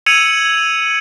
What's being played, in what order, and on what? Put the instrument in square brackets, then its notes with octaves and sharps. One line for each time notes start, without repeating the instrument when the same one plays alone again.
[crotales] E6 G#6 C#7 D#7 F7 F#7